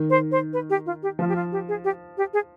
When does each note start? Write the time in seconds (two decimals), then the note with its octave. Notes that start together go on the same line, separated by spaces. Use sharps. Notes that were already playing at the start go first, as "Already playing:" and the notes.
Already playing: D#3
0.10 C5
0.32 C5
0.53 B4
0.70 G4
0.86 F4
1.03 G4
1.19 F3 F4
1.29 G4
1.36 F4
1.52 G4
1.68 G#4
1.84 G4
2.17 G4
2.33 G#4